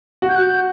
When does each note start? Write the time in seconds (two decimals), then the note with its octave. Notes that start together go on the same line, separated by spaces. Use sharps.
0.22 F#4
0.29 G6
0.36 F#6
0.43 G6